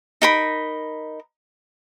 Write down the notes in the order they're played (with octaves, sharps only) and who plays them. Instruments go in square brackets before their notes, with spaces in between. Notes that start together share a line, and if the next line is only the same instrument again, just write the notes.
[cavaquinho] D#4 A#4 B5